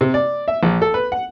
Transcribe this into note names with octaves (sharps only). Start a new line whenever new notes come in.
C3
D5
E5
A#1
A4
B4
F#5